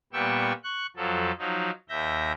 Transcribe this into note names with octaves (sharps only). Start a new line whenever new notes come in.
A#2 G3 B3 G5 C#6 E6
C#6 F#6
F2 F3 F#3 A4
F3 F#3 D#4
D#2 E5 G6 A#6